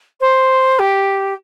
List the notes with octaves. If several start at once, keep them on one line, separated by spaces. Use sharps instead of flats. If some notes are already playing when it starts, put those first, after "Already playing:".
C5
G4